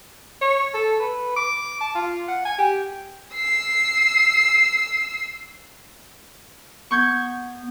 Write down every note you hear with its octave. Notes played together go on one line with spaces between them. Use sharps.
C#5
A4
B4
D6
A5
F4
F#5
G#5
G4
E6 C7
B3 C#6 G6 G#6